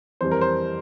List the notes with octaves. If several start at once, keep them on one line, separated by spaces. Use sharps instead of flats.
F2 E3 G3 C5
A#4
C5